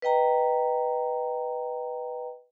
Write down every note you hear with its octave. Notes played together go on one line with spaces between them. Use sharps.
B4 D#5 G5 A#5